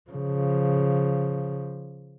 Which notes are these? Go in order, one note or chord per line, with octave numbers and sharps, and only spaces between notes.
C#3 F3